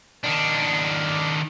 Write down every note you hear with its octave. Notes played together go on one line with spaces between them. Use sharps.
D#3 D4